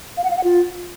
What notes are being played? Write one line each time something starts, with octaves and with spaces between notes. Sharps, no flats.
F5
F#5
F5
F#5
F4